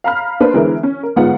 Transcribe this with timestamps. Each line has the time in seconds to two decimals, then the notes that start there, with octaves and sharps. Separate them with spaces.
0.04 F5 A#5 B5 F6
0.40 A#3 D4 B4 C5
0.54 D3 E3 G#3 B3 E4 A#4
0.83 C#4
1.03 A#4
1.16 G1 G#2 G#3 B3 F4 F#5